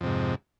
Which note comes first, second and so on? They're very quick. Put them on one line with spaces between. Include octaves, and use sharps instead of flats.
F2 C3 G#2